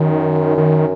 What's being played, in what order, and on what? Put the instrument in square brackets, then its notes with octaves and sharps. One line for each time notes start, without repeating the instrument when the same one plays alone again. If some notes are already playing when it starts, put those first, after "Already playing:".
Already playing: [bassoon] F#2 [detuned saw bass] D#3
[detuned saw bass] D#3